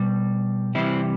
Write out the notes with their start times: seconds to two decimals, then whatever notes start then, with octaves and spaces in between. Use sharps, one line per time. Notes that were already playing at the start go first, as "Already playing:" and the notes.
Already playing: B2 G3
0.75 C3 E3 G3 C4 E4